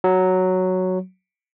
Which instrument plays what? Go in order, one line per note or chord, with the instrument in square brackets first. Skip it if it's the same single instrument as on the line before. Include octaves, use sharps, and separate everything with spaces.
[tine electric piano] F#3